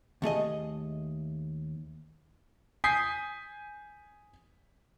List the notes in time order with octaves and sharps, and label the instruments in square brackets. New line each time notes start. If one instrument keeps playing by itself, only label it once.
[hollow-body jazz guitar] D#2 A3 G#4 D#5
[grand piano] G#5 D#6 G6 B6 C7